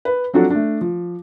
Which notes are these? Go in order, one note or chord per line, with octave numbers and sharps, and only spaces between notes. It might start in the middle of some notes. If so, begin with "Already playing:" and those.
B4
F3 F#3 C4 D4 F#4 A4
A3 D4
F3